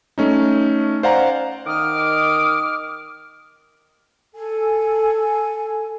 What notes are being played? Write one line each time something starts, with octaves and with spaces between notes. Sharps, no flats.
A3 C#4 D#4
C5 D5 F5 F#5 G#5 A#5
D#3 D6 D#6 F6
A4 G#5